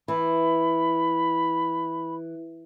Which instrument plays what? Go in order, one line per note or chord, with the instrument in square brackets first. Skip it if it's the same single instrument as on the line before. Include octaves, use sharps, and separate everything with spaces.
[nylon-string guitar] E3 [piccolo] B5